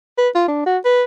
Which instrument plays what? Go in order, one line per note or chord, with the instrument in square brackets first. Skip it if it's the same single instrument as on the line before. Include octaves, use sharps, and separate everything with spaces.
[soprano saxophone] B4
F4
D4
F#4
B4